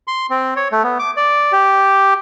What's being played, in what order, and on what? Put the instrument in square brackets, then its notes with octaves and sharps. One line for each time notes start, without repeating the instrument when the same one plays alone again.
[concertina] C6
C4
C#5
A3
B3
D6
D5
G4